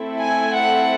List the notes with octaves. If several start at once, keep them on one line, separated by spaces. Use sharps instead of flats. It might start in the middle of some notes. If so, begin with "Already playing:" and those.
Already playing: A3 C4 E4 A4
G#5
F#5